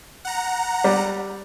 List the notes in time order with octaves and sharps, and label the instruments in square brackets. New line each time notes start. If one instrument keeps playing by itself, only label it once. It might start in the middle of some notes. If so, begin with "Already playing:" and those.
[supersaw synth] F#5 A#5
[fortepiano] G3